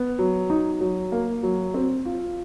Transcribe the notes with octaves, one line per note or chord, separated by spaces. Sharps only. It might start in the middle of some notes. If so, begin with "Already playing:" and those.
Already playing: B3
F#3
D#4
F#3
A#3
F#3
C4
F4